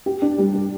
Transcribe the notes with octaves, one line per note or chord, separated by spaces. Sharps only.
G4
D4
G3
G3